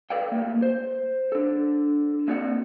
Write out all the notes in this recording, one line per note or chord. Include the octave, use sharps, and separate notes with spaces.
A4 B4 D5 F5 G5
A2 G3 A#3
C5
D4 A4
A#3 C4 F#4 D5 F#5